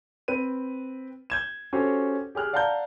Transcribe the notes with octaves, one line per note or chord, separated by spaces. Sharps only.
C4 B4 D#7
G6 G#6 E7
C#4 F#4 G4 A4 C5 C#5
G4 G#4 F6 F#6
D5 F5 F#5 A5 A#5 G6